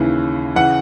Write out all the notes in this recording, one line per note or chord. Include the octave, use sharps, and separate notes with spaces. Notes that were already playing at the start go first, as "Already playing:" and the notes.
Already playing: D#2 C#3 E3
C#3 E3 F#5